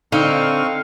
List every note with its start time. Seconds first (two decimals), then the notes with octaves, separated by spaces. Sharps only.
0.12 D3 C4 D#4 F5 C#6